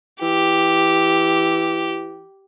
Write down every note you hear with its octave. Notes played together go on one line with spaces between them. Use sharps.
E3 G4